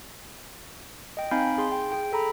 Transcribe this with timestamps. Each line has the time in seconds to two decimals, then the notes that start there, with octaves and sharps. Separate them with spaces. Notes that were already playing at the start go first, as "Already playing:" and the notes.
1.17 D#5 G5
1.31 C4 D#4 F5 G#5 B5 G6
1.58 G#4 C6
1.72 G5
1.92 G#4 G5
2.13 A4 A#5 B5